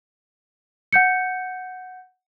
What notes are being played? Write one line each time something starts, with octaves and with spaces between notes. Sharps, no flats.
F#5 G6 C#7